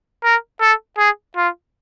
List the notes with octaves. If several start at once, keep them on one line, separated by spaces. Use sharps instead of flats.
A#4
A4
G#4
F4